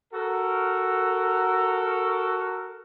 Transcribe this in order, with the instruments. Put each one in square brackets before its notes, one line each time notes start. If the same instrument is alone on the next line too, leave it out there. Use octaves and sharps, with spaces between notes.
[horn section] F#4 A4 A#4